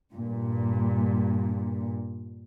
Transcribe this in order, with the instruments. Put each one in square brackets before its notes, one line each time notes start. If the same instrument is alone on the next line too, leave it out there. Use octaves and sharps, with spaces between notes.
[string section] G2 A#2